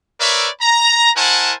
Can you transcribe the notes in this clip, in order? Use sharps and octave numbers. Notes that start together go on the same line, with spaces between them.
A#4 B4 C#5 D5 E5
A#5
E4 A#4 C5 F#5 G#5 A5